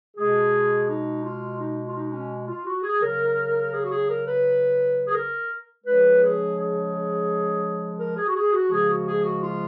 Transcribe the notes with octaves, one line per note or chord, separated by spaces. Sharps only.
B2 G#3 G#4
D#4
F4
D#4
F4
D#4
C#4
F4
F#4
G#4
C#3 F#3 A#4
G#4
F#4
G#4
A#4
B4
G#4
A#4
C#3 F3 G#3 B4
G#4
G#4
A#4
G#4
F#4
G#4
F#4
C#3 F3 G#3 G#4
F#4
G#4
F#4
F4